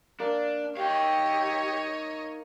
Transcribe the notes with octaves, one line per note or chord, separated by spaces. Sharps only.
A#3 D4
D#4 G4 C#5 D#5 F5